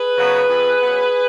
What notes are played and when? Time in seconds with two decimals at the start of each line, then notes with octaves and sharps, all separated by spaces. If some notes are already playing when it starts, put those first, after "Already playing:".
Already playing: G#4 B4
0.16 C#3 F#3 B3
0.49 F2
0.80 C#3 F#3 B3